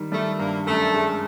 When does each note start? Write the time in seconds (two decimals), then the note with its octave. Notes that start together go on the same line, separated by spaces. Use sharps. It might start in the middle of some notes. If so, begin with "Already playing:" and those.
Already playing: D#3 G3
0.12 G3 A3
0.39 G2 A#3
0.66 F#2 A3
0.94 G#3